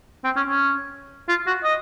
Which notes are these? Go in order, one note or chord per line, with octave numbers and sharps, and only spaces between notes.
C4
C#4
C#4
F4
F#4
D#5